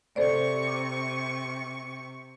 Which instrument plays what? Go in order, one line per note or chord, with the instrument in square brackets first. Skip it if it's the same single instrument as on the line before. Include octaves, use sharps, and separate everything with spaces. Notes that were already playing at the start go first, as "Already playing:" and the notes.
[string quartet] C3 C#6 [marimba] A4 C5 D5
[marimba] D6